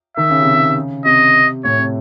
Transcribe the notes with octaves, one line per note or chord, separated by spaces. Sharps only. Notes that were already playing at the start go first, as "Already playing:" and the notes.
D#3 E5
C#3
C3
C#3
C3 D#5
A2 C#5
C3